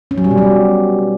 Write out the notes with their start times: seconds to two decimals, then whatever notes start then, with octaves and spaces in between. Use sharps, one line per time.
0.11 C#4
0.18 F#3
0.24 G3
0.31 B2
0.38 F#3